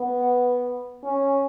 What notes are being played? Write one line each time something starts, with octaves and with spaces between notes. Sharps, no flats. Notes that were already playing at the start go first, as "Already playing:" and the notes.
Already playing: B3
C#4